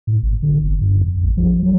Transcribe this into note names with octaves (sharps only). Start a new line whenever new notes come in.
A2
G#1
D3
F#1
G2
F2
A1
F3
F#3